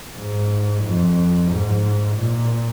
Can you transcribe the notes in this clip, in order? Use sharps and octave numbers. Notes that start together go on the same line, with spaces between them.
G#2
F2
G#2
A#2